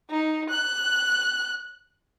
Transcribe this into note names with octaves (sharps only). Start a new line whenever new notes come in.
D#4
F#6